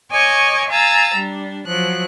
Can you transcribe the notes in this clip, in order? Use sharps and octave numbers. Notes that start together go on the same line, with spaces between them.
C#5 D#5 G#5 C#6 D6
F5 G#5 A#5 E6 A6
G3 D4
F3 F#3 F#6